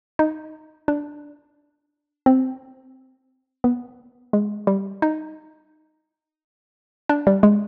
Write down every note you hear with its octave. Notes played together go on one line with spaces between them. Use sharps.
D#4
D4
C4
B3
G#3
G3
D#4
D4
G3
G#3